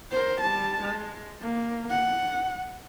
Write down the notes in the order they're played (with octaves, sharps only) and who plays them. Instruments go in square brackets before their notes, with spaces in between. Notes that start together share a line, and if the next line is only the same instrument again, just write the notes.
[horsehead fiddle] A#4 C5
G3 A5
G#3
A#3
F#5